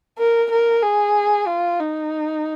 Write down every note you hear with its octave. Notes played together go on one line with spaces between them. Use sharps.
A#4
A#4
G#4
F4
D#4